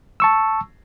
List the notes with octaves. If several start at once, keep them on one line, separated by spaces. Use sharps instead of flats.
A5 C#6 E6